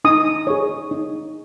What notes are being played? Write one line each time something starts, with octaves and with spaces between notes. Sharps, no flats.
D#4 D#6
G#4 C#5
D#4